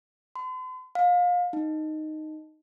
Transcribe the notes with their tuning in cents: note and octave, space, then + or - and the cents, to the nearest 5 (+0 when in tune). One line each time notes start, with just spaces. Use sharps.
C6 -45
F5 +30
D#4 -5